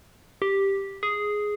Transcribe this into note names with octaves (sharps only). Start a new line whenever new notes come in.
G4
G#4